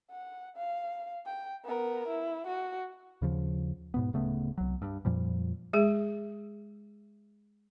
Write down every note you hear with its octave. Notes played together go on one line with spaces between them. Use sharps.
F#5
F5
G5
B3 A#4
E4
F#4
D#2 C#3 F3
G#2 B2 B3
D1 C#3 A3 B3
C2 F#3
G2
F2 A#2 F3 G3
G#3 G#4